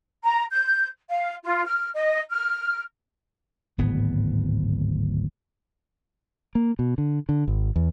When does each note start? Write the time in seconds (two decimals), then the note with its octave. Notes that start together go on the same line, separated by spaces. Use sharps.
0.24 A#5
0.51 G6
1.09 F5
1.43 F4
1.65 F6
1.94 D#5
2.30 F6
3.78 D1 G#1 A2 B3
6.55 A#3
6.79 B2
6.98 D3
7.29 D3
7.48 G#1
7.76 E2